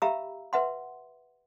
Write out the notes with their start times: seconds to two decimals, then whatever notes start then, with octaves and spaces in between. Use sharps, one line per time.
0.02 G4 E5 F5 A#5 B5 E6
0.53 B4 E5 F#5 C6